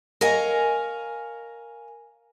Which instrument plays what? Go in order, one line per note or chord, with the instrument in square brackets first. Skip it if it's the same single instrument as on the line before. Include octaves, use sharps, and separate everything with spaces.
[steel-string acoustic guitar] A#4 C#5 D#5 F5 G#5 A#5